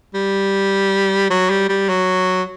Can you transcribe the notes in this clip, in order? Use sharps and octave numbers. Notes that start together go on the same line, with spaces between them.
G3
F#3
G3
G3
F#3